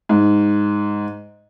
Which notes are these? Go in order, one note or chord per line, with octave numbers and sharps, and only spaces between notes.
G#2